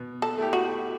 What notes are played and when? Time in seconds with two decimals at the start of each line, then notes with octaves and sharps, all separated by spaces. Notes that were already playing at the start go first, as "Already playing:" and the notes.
Already playing: B2
0.22 A4
0.37 A3 E4 G4
0.53 F#4